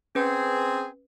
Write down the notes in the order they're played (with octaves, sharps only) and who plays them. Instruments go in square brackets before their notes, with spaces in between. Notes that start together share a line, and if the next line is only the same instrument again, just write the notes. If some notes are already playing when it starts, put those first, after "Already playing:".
[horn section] C4 G#4 [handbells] C#4 B4